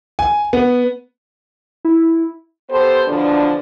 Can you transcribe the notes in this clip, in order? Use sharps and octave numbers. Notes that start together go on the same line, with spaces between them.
G#5
B3
E4
B3 G4 A4 C5
E2 B2 D3 F3 D4